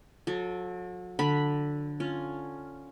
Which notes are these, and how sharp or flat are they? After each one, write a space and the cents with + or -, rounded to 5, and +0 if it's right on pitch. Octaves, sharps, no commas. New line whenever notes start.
F#3 -40 A4 -15
D3 +0 B5 +0
C#4 +0 F4 +0